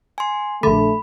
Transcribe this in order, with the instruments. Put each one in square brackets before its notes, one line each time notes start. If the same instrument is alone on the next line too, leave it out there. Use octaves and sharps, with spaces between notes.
[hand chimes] G#5 C6
[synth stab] A#1 D3 [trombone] A3 [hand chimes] B5